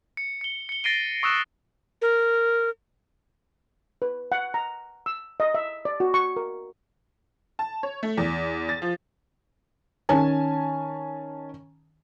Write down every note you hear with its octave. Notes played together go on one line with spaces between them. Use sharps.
C#7
C#7 G7
C#7 G7
A6 A#6 C7 D7 D#7 G7
C#6 D#6 E6 F#6 E7
A#4
B4
F#5
A#5
E6
D#5
E5
D5
F#4
C#6
A#4
A5
C#5
A3
E2
A6
F3
D#3 C#4 G#5 A5